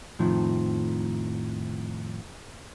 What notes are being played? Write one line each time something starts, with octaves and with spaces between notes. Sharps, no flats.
F2 A2 D#3 F3